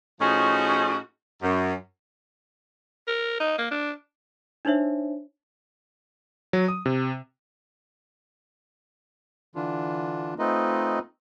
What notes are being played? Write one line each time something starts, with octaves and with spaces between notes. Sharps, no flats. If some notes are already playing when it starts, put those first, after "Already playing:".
A2 F3 C#4 D#4 F#4 G#4
F#2
A#4
D#4
A#3
D4
D4 D#4 C5 C#5 E5
F#3
D#6
C3
D3 E3 D4 F4
A3 C4 D#4 F4 B4 D#5